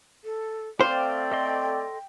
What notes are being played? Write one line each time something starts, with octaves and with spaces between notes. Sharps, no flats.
A4
A3 C4 C5 D5 F5 G5
A4 D#5 C6